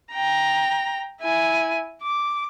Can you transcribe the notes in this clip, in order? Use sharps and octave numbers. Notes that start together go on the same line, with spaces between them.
G5 A#5
E4 G#5
D6